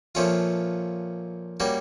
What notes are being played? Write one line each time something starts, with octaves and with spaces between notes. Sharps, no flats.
A#2 F3 A3 C#4 F4
G3 A#3 C#4 F#4